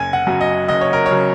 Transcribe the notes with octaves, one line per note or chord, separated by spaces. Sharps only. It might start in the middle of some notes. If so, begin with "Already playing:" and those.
Already playing: F#1 G#5
F#5
F#2 C#3 F#3
D#5
F#1 D#5
C#5
A#4
C#5
C#3 F#3